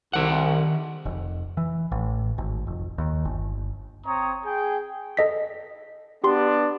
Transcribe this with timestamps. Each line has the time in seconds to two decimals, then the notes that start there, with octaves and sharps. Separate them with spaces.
0.13 C2 D#3 F#5
1.05 F1
1.57 E3
1.92 A1
2.38 G#1
2.67 F1
2.98 D#2
3.25 G1
4.06 C4 C#5 A#5 D#6
4.45 G#4 G5
5.17 A4 D#5 B6
6.24 B3 D4 G4 C6